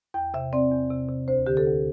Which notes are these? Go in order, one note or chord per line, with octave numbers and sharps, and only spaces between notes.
E2 G5
C3 E5
C4 D5
E2
C3
C3
D2 C5
D3 G4
A4
D2